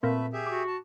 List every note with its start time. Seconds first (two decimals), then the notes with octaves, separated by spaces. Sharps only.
0.03 A#2 A3 C4 B4 E5
0.33 G4 G#4 E5
0.47 F#4 D6
0.67 A5